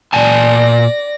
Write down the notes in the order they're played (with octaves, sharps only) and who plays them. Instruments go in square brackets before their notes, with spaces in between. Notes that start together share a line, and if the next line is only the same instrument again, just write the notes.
[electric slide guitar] A#2 G#5 A5 [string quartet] D5 A#6